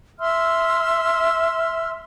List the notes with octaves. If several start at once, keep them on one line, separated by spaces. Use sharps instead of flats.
E5 C6 E6 F6